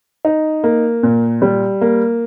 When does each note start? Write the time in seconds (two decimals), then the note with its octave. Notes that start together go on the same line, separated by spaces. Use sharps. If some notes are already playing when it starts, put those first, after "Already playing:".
0.25 D#4
0.64 A#3
1.03 A#2
1.42 G3
1.81 A#3